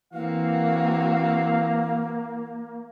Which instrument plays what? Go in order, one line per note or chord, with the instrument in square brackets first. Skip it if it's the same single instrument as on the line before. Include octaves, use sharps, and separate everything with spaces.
[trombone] E3 [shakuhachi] A#3 [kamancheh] C4 F#4 [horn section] F5